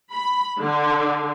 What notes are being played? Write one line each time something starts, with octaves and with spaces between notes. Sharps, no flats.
B5
D3